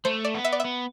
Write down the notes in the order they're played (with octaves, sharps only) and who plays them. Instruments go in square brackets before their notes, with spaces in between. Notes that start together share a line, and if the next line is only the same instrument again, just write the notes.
[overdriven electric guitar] A3 [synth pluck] C5
[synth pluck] D5
[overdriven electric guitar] B3
[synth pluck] E5
D5
E5
[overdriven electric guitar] B3